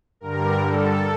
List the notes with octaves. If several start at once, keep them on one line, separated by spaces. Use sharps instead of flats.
G2 D3 G3 A#4
A4